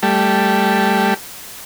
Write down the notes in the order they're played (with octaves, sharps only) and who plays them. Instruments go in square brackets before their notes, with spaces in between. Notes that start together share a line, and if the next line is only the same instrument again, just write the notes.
[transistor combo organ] G3 A3